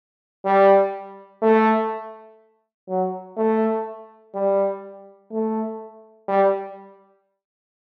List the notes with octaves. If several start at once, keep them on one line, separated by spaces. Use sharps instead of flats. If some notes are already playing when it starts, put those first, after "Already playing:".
G3
A3
F#3
A3
G3
A3
G3